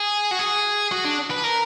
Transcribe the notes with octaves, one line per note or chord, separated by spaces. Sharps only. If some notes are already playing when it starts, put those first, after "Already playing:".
Already playing: G#4
F#4
G#4
F#4
D4
B4
A#4